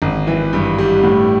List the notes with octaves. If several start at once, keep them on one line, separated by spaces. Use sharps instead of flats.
G#1
E3
G2
G3
A2